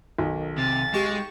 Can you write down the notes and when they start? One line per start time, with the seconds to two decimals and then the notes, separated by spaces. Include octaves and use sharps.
0.18 B1 D#3
0.58 C3 A6
0.94 G#3 G4 C#6 E7